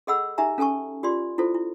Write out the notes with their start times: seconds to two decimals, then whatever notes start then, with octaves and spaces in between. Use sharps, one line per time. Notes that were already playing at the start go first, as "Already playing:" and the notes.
0.07 G#4 A4 D#5 F#5 B5 E6
0.38 D#4 G4 E5 G#5 A#5
0.58 C#4 A4 G#5 A5 C#6
1.03 F4 G4 D5 C6
1.38 E4 F4 A4 C5
1.54 E4